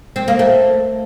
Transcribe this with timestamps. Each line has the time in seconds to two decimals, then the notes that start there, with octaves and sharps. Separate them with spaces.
0.16 C4
0.28 A#3
0.39 A3